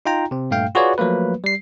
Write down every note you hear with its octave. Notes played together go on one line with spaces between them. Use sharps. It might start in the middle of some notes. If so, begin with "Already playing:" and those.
D#4 F4 G5 A#5
C3 C4
G2 A#2 A3 F5 G5
F4 F#4 G#4 B4 C#5 D5
F3 F#3 A3 A#3 B4
G3 C7